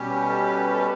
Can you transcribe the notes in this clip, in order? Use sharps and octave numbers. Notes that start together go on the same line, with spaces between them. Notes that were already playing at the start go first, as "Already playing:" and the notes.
Already playing: B2 G3 C#4 G4
B4
A4
B4
A4
B4